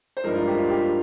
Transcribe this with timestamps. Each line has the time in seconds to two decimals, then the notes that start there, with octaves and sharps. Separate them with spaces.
0.17 C5
0.24 G2 F3 G#3 D#4 A#4
0.35 F4
0.47 G4
0.58 F4
0.69 G4